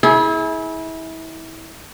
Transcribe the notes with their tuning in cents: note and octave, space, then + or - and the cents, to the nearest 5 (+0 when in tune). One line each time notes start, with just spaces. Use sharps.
E4 -30 G#4 +20